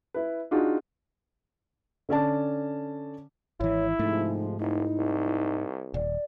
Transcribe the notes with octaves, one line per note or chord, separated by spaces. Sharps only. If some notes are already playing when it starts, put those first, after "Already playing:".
E4 B4
D4 D#4 F4 F#4 G#4
D3 C#4 D5 A5
G#1 E3 E4 C#5
G#2 C3 F3 G#3 A3 D#4
F1 D#4 E4
C2
D#1 D5